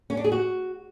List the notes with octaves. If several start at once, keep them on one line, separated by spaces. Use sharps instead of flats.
C#4
D4
G#4
F#4